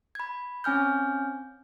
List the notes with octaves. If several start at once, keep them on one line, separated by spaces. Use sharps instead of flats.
B5 G#6
C4 C#4 G#5 F6 G6